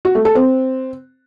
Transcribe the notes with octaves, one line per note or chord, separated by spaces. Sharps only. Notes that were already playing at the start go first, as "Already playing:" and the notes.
F#4
A3
A4
C4